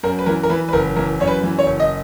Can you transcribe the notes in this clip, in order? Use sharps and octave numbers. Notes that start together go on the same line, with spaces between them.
F#2 A#4
B4
E3 A#4
A#4
E3 B4
B4
F#1 A#4
E3 A#4
F#2 C#5
B4
E3
C#5
F#1
D#5